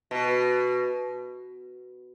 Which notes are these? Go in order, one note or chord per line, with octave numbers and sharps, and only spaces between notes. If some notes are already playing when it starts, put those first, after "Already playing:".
B2